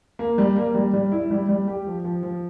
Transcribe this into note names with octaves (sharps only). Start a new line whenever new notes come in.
A#3
G3
A#3
G3
G3
E4
G3
G3
G4
F3
F3
F3